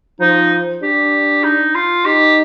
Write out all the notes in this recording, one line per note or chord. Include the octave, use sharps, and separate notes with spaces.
F3 D#4
D4 G4
D#4
F4
D#4 G4